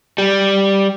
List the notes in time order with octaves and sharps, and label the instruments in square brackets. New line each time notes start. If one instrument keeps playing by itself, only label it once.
[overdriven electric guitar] G3